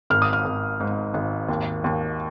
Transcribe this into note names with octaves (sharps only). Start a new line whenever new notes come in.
G#1 F6
D#6
F6
G#1
G#2
G#1
D#2
D#2